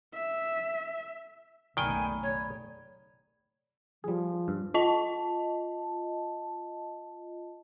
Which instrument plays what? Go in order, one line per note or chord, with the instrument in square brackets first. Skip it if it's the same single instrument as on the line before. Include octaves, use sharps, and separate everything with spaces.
[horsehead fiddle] E5
[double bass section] F#1 B1 A3 [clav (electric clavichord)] D#3 G5 [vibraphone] D5 B5 [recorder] G#5
[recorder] C#5
[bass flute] F3 [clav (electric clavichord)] G3 G#4
[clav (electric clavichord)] G2
[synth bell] F4 D#5 A5